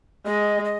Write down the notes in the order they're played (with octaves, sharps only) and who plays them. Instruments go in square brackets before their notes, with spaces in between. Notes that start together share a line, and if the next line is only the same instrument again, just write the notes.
[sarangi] G#3 [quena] D#5
[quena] D#5